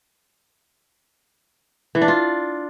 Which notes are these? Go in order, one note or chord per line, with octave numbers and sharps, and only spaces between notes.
E3
D4
F4